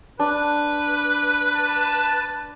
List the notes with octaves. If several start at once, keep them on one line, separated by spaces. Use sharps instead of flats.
D4 B4
A5